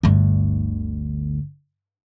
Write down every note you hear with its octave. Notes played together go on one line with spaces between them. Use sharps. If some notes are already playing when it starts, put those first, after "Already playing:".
G1 D2